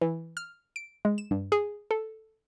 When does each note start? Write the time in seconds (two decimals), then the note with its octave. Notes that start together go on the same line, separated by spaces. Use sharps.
0.01 E3
0.37 F6
0.76 D7
1.05 G#3
1.18 E7
1.31 G2
1.52 G#4
1.91 A4